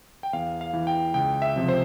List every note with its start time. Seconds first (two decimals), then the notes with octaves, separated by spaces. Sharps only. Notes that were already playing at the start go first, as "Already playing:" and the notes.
0.23 G5
0.33 E2 F5
0.61 F5
0.73 E3
0.87 G5
1.14 C#2 G5
1.42 E5
1.56 C3 F3
1.68 C5